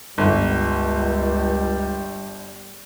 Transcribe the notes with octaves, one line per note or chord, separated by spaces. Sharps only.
G1 C#2 G3